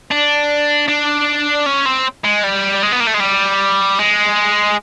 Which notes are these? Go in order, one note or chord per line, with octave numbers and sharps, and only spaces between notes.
D4
D4
C#4
C4
G#3
G3
G#3
B3
A#3
A3
G#3
G3
G#3